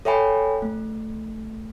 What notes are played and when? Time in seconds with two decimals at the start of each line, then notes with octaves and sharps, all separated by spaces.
0.05 A4 C#5 E5 G5 G#5 B5
0.62 A3